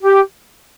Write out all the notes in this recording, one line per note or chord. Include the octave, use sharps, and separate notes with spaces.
G4